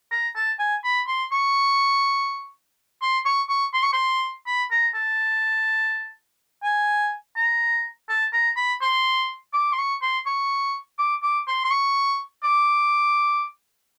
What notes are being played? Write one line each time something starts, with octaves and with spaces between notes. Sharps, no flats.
A#5
A5
G#5
B5
C6
C#6
C6
C#6
C#6
C6
C#6
C6
B5
A#5
A5
G#5
A#5
A5
A#5
B5
C6
D6
C6
C#6
C6
C#6
D6
D6
C6
C6
C#6
D6